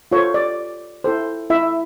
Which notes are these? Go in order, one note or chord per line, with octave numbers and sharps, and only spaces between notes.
F4 A4 C5 C#5
D5
E4 A4 C5
E4 E5